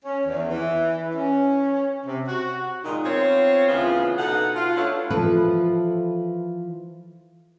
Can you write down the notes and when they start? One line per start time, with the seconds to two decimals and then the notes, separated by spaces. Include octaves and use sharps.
0.04 C#4
0.26 E2
0.50 E3
1.16 C#4
2.06 C3
2.27 F#4
2.84 A#2 D#3 G#3 D#4
3.05 B3 C4 F4 C5 C#5
3.69 D2 C#3 E3 B3 F4
4.18 B2 D#4 A4 F#5
4.56 F4
4.77 A3 D4 F#4 A4 B4 C#5
5.10 E3 F3 A4 B4